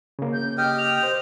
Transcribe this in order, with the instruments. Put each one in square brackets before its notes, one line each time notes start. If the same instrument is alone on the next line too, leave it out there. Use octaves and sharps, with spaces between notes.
[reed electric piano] C#3 A#3
[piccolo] G6
[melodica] G4 D#5 G5 [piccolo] F6
[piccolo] F7
[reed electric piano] C5